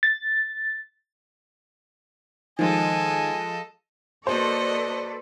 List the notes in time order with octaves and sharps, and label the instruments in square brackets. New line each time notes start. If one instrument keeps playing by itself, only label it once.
[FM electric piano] A6
[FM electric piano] D#3 [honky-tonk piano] F3 G#3 [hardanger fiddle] A4 D#5 [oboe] G#5
[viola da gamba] A#3 F#4 D#5 [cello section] A4 B4 D5 [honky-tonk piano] C5